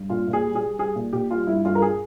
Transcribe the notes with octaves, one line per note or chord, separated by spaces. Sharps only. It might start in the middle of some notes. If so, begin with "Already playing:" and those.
Already playing: G2
A#2 F4
A#2
G#4
G3
G#4
G3
G3 G#4
A#2
A#2 G4
G3 F4
G2 E4
G2 F4
A#4
G#4